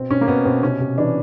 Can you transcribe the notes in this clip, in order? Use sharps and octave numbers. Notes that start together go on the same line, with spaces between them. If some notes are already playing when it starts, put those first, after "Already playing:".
Already playing: B2 C4
B2 C#4
A#3
B2 B3
B2 C4
C3 C#4
C3
E3 D4